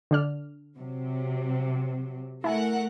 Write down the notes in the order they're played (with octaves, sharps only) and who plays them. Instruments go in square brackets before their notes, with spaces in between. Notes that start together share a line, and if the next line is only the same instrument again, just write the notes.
[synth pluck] D3 D4 F6
[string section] C3 F#3
[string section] A3 A#4 F#5 [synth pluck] E4 G#5